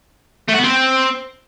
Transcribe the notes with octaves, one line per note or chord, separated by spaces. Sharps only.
A3
F#4
B3
C4